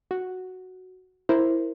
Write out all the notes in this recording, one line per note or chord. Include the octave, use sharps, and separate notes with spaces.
F#4
E4 A#4 C5